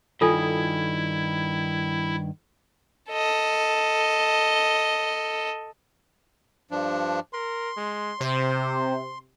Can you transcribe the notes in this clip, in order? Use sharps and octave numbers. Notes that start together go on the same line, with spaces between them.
G2 D#3 E4 F4 A4 G#5
A4 D#5
G2 F3 D4
A#4 C6
G#3
C3 C5